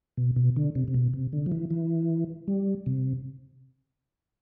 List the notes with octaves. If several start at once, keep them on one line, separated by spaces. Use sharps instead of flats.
B2
B2
D3
C3
C3
B2
C3
D3
F3
E3
E3
G3
C3